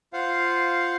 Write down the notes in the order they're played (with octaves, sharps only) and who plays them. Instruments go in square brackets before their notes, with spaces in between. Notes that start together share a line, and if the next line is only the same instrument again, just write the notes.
[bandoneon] F4 C5 F5 F#5